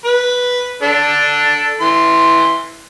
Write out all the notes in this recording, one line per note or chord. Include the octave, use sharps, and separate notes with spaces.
B4
D4 A4
E3 C6